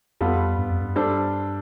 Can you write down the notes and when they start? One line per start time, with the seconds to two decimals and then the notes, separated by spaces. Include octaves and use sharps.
0.21 F2 G3 B3 F4 A4
0.58 G2
0.69 F2
0.81 G2
0.96 G3 D4 A4 C5